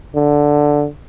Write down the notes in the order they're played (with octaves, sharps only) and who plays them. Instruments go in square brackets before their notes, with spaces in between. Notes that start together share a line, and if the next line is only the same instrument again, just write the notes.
[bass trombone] D3